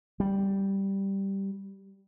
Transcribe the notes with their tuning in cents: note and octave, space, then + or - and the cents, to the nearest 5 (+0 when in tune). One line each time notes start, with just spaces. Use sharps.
G3 -5